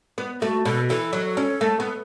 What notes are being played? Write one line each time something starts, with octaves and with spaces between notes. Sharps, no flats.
B3
A3 F#4
B2 A4
E3 A4
F#3
C#4
A3
B3